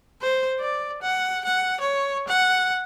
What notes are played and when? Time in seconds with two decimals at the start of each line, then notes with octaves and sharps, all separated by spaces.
0.21 C5
0.60 D5
1.02 F#5
1.45 F#5
1.80 C#5
2.28 F#5